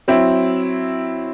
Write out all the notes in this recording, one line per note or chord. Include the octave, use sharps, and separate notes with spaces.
F#3 C4 E4